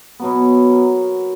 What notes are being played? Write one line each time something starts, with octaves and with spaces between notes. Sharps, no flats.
B2 F#3 B3
A#4